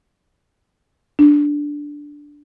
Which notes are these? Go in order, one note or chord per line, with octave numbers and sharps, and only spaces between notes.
D4